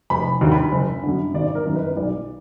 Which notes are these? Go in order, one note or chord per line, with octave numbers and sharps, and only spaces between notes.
F1 B5
D#2 D3
B5
F#1
F#2 D3
G#1 D5
A#4
F#2 D#3
B4
B1 D5